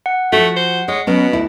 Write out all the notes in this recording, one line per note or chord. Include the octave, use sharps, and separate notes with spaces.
F#5
F3 A3 F#4
C5
G#3 C#5
B2 F#3 B3 C#4
D2 E4